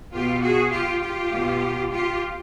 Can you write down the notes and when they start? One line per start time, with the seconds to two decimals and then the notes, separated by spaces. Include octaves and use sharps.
0.12 B2 F4 G4
0.42 F#4 G#4
0.72 F4 G4
1.02 F4 G4
1.32 B2
1.91 F4 G4